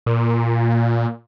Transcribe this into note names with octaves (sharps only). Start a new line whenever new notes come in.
A#2